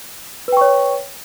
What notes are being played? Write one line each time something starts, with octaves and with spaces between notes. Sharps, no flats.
B4 C#5 G5 C#6